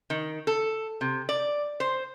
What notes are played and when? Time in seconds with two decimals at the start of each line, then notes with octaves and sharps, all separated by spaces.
0.10 D#3
0.47 A4
1.01 C3
1.29 D5
1.80 C5